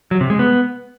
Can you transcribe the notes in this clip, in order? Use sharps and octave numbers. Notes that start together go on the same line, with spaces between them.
F#3
C3
G#3
B3